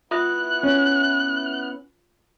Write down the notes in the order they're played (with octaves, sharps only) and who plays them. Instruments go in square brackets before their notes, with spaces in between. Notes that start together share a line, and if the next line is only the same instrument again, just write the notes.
[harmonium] B3 E4 [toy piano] F4 E5 D#6 [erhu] F#6
[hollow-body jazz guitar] C#4